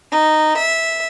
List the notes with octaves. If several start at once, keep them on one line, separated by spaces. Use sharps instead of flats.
D#4
E5